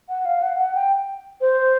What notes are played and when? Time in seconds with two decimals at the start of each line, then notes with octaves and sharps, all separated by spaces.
0.09 F#5
0.25 F5
0.42 F#5
0.59 F#5
0.75 G5
1.41 C5